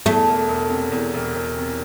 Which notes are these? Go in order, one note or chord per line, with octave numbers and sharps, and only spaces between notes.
E2 A3
E1
E1
C3
E2
E1
E1
C3